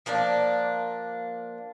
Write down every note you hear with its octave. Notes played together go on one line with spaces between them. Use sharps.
F3 A#3 D4 D5